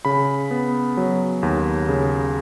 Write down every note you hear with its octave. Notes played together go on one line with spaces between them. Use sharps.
C#3 B5
B3
F#3
D#2
C#3